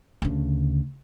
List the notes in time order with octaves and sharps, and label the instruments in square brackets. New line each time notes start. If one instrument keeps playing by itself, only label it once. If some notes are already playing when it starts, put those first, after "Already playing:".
[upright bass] D2 C#3